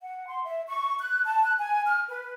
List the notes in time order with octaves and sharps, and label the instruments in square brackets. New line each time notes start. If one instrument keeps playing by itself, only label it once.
[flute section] F#5
C6
E5
C#6
F#6
A5
F#6
G#5
F6
B4